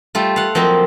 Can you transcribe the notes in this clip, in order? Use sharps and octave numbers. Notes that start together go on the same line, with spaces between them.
G3 A3 F4
F5 F#5
F3 F#3 A#3 C4 C5 D#5